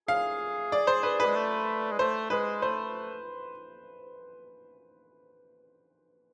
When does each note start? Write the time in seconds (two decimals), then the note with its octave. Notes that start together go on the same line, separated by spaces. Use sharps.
0.08 G#4 F5
0.72 D5
0.87 C5
1.03 B4
1.20 B4
1.25 G#3
1.36 A3
1.92 G#3
1.99 A3 C5
2.30 G#3 B4
2.62 A3 C5